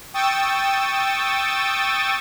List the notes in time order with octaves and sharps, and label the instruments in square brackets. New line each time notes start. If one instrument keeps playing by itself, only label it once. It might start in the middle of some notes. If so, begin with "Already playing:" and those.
[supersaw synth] G5 C#6 D#6 E6 A6